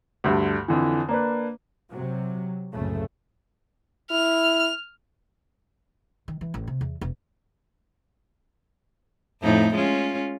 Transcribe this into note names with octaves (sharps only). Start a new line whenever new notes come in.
D2 G2 D3
F2 D3 E3
A#3 D4 B4
C3 F#3
F#1 C2 A2 C#3 A3
E4 F6
D#3
E3
A1
C3
E2
E1
F2 A2 D#4
G#3 C#4 F4